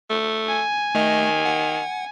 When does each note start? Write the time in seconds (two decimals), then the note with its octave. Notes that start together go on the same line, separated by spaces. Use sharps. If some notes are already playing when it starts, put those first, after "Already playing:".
0.10 A3
0.48 G#5
0.95 D#3 A3 D#5
1.45 F#5